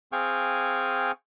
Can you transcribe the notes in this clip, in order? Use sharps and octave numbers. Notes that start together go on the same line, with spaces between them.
C4 G#4 F5 G5 G#5 C#6